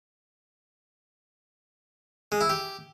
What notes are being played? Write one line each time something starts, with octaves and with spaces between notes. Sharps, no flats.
G#3
E4
G4